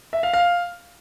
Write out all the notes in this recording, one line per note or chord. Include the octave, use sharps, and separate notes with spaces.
E5
F5
F5